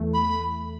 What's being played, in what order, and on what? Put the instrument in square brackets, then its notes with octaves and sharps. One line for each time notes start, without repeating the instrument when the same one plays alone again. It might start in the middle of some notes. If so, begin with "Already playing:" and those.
Already playing: [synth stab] E2 E3 A3
[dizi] B5